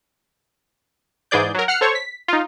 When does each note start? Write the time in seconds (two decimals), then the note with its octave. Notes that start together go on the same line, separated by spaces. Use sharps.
1.31 G#2 E3 G#4 D5 G6
1.55 F#3 A#4
1.68 F#5 F6 C7 C#7
1.81 A4 C5 C#5 C#6
1.95 B6
2.28 D#4 F4